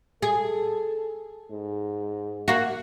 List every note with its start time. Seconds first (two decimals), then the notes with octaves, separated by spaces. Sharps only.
0.22 G#4 A4
1.51 G#2
2.48 A#3 F#4